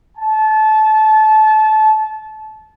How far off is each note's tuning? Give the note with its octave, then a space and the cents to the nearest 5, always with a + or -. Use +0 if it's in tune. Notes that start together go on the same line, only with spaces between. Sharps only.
A5 -25